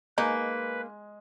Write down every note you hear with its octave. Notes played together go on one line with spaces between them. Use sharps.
G#3 A#3 D#4 B4